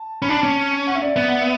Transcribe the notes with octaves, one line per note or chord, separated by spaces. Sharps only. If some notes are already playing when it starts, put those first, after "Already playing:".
Already playing: A5
C#4 B5
D4 A5
C#4
F#5
E5
D5
B3 E5
F#5
E5